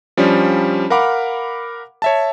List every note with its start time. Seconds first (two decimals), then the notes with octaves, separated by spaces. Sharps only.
0.17 F3 G3 C#4 D4
0.90 A#4 F5 F#5 B5 D6
2.02 C#5 E5 A5